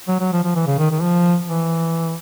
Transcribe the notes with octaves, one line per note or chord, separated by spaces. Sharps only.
F#3
F#3
F3
F3
E3
C#3
D#3
D#3
F3
E3